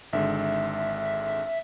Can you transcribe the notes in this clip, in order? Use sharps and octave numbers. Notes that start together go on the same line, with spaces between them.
G#1 D3 G#3 E5